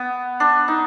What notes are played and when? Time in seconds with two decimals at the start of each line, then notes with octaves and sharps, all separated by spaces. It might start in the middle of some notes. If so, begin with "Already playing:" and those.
Already playing: B3
0.40 D4
0.68 D#4